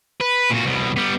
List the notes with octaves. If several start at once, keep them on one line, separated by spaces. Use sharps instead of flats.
B4
A#2 F#4
C2 B2
G3 B3